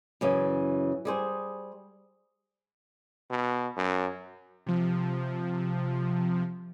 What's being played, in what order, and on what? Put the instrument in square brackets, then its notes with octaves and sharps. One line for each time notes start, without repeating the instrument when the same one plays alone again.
[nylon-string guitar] F#2 C#3 E3
G3 G#4 C5
[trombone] B2
F#2
[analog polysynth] C3 F3